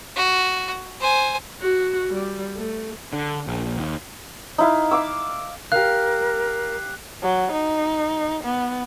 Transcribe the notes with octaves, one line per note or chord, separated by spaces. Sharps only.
F#4
C5 G#5
F#4
G3
A3
D3
A#1
D#2
D#4 E4 F5
F5 D6 E6
G4 A#4 F5 F#6
F#3
D#4
B3